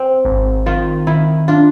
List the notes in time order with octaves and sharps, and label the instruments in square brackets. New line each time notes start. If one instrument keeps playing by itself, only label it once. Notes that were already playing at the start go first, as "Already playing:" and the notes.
Already playing: [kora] C4
[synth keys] G#1
[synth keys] D#3 [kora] F4
[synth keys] D#3 [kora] E4
[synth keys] D4 [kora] F4